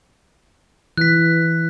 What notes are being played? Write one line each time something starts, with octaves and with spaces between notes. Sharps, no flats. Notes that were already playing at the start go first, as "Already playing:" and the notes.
E3 F#6 B6